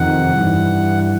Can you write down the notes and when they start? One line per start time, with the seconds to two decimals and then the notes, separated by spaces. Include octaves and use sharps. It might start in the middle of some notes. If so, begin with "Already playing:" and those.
Already playing: F2 C3 D#3 F#5
0.31 G2 E3